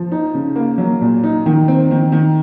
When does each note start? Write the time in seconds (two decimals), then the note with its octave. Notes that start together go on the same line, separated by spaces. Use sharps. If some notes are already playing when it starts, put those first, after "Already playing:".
Already playing: F3
0.12 D#4
0.34 C#3
0.56 A#3
0.78 F#3
1.01 A#2
1.24 D#4
1.46 D#3
1.68 C4
1.91 D#3
2.12 D#3